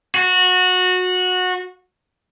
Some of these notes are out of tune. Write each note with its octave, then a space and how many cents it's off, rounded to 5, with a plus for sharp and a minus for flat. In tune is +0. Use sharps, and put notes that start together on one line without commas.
F#4 -20